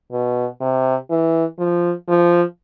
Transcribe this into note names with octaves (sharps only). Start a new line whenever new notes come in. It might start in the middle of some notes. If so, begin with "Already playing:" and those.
B2
C3
E3
F3
F3